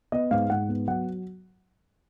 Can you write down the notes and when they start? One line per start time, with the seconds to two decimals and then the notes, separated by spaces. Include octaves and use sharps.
0.12 B3 D#5
0.31 G#2 F5
0.50 G#2 F#5
0.69 B3
0.88 F#3 F#5